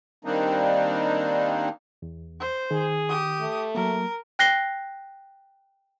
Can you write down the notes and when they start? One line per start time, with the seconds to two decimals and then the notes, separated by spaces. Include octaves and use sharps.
0.25 D#3 G3 A#3 C4 D4 D#4
2.02 E2
2.40 C5
2.71 D#3 G#4
3.09 G4 D#6
3.41 A3
3.75 F#3 A#3 A#4
4.39 G5 F#6 A#6 C7 G7